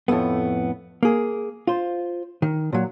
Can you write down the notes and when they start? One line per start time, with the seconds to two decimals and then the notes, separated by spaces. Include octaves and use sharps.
0.08 F2 A2 C3 A3 B3
1.03 A#3 G#4
1.67 F4 C5
2.42 D#3
2.72 A#2 F#3